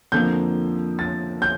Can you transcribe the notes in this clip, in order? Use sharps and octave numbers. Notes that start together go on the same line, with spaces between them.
F2 D3 F3 A#3 G6
A6
G6